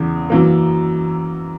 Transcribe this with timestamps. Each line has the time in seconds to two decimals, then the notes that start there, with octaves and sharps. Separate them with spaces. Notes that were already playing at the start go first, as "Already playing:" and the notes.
Already playing: E2 C#3 E3
0.30 F#2 E3 A#3